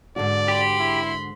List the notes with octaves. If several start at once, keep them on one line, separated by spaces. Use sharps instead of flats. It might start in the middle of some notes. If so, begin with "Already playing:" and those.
G#2 D3 F#4 D5
G4 B5 C6
E4